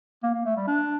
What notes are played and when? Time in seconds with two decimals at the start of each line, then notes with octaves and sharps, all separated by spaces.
0.23 A#3
0.34 A#3
0.45 A3
0.57 G3
0.67 D4